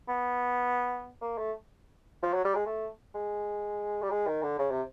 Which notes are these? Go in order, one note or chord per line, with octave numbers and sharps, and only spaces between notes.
B3
A#3
A3
F3
F#3
G3
G#3
A3
G#3
G3
G#3
D#3
D3
C#3
C3